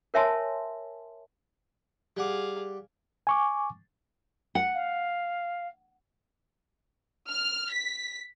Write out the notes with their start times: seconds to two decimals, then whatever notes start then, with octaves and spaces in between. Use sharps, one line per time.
0.14 A#4 C#5 E5 G#5 A5 C6
2.17 G3 G#4 F5 F#5 D6
3.27 G#5 C#6 D6
4.55 F#5
4.75 F5
7.31 F6
7.72 B6